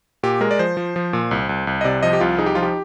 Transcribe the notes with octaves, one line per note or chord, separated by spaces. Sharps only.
A#2 G4
G#3 A#4
D5
F3 C5
F3
F3
A#2
C2
C2
C2
D#5
C3 D5
F3 D#5
G4
C2 F4
D#4 G#4
G4
F3 F4
G4